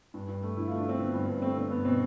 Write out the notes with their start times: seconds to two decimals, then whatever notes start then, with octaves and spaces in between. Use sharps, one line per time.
0.14 G2 D4
0.28 G2
0.43 A3
0.56 D3 E4
0.68 F4
0.71 A3
0.78 D4
0.85 A3 C4
0.99 D3 B3
1.14 G2
1.29 G2
1.42 A3 C4
1.57 D3 C4
1.71 G2 B3
1.85 B2 C4